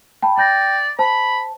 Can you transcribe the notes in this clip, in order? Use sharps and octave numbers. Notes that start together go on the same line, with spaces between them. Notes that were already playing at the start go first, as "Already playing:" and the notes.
G5 A5 B5
D5 G5 G6 A#6
C5 A5 B5